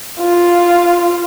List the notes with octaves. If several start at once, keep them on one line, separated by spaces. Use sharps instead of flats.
F4